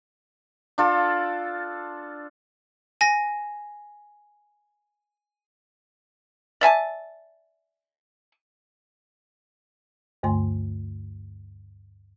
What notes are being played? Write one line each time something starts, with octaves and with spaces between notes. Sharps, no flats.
D4 F4 A4
G#5 A#6
D5 E5 G#5 A5
D2 G2 D3 A3 G#5 C6